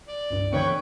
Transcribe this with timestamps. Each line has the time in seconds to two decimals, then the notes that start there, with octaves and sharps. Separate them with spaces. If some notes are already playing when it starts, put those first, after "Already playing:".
0.08 D5
0.30 C#2 G2
0.53 D3 E3 C4 B4 C#5 G5 C#6 C#7